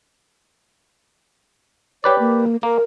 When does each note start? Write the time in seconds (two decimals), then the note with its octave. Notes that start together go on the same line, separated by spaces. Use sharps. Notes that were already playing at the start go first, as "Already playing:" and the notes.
2.04 G4 B4 C#5 D5
2.19 A#3
2.63 A#3 A#4